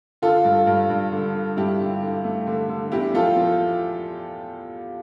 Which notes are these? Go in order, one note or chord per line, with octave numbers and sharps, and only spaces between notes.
D3 F4 A4
G2
G2
G2
D3
D3
G2 E4 G4
D3
D3
A3
D3
D3
E2 E4 G4
F3 F4 A4
F3